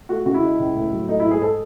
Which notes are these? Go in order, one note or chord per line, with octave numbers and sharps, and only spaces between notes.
A3 F#4
C#3 F#4
E4
G#3
C#2
A2
F#3
A3 D#4
E4
G#2
G#4
A4